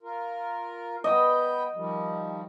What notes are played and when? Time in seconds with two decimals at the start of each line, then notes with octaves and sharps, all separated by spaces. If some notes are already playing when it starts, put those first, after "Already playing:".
0.01 F4 A#4
1.04 B3 D#5 G5
1.74 D#3 F3 G3